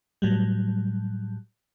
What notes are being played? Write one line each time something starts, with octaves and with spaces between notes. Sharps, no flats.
A2 F#3 G3